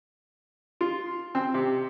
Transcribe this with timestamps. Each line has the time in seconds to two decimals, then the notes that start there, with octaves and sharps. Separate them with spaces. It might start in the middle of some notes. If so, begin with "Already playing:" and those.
0.81 F4
1.35 C4
1.54 C3